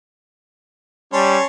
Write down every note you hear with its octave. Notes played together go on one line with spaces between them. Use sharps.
G3 C#4 C#5 A5 C6